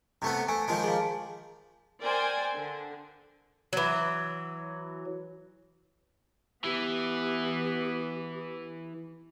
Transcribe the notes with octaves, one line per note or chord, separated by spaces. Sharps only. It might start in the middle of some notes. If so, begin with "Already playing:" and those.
C3 A3 B3
A3 G#5
D#3 F3 G#3
G#4 F5
A#4 C5 D5 G5 G#5
D3
E3 F#3
E3 B3 G4